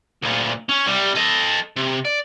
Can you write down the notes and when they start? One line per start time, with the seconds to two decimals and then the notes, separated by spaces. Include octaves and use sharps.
0.22 D2 A#2
0.69 C#4
0.86 C2 G3
1.15 A4 D#5
1.77 C3
2.05 D5